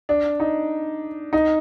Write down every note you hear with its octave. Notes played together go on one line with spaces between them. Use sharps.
D4
D#4
D#4